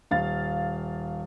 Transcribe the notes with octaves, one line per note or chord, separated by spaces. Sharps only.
D#1 F5 A6